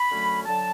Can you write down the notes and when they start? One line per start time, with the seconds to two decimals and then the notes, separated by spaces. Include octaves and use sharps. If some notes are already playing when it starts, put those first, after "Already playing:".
Already playing: B5
0.10 F#2 D3 F#3 A3 C#4
0.46 D3 F#3 A5